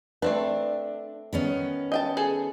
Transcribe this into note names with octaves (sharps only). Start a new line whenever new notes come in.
A3 C4 D4 B4
D#3 B3 C#4
D#5 G5 A5
G#4 A4